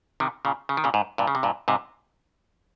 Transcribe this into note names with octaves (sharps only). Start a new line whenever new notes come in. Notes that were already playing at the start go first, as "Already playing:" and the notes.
C3 D#3
A#2 C#3
C#3
D#3
A#2 C#3
G#2
G2 A#2
C#3
C3
G2 A#2
G#2 C3